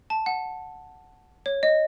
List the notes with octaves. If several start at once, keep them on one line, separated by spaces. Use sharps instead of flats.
A5
F#5
C#5
D#5